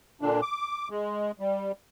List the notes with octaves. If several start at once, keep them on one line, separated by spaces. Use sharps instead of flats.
A#2 D3 D4
D6
G#3
G3